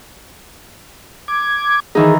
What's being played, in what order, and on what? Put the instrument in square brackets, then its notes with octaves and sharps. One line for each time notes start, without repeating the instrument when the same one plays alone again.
[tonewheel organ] D6 G#6
[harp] D#3 E3 D#4 [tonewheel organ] G#4